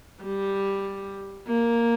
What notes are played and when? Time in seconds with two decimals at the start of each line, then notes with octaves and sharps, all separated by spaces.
0.23 G3
1.47 A#3